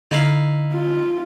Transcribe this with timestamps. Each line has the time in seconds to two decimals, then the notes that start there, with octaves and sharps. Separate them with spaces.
0.11 D3 D#4 E4 F5
0.72 F4